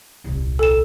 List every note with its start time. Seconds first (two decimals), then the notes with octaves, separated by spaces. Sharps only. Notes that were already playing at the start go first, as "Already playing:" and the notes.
0.24 D#1 C2
0.59 A4 E7